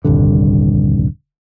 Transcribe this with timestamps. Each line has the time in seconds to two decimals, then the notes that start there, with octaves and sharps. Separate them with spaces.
0.05 D#1 C2 G2 D3